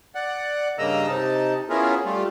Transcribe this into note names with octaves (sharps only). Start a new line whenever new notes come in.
D5 F#5
G2 C#3 A#3 D#5 A#5 E6
C3 D#4 A5
B3 C#4 E4 F4 G#4 A#4
G3 A3 F4